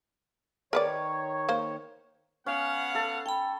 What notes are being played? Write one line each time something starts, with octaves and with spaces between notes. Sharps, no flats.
D#3 A#4 B4 C#5 D5
A#3 C5
B3 C#4 F5 F#5
A4 A5
G5 A5 B5